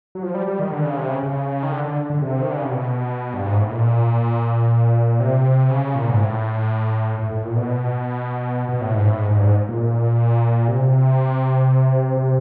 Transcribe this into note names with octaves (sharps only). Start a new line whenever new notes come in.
F#3
F3
G3
G3
D#3
D3
C#3
C3
C#3
C#3
D#3
D3
D3
D3
C3
D#3
D3
C#3
C3
B2
G2
G#2
A2
A#2
C3
C#3
A#2
G#2
A2
A2
A2
A#2
B2
B2
A2
G#2
A2
G#2
G#2
G2
G#2
A#2
C3
C3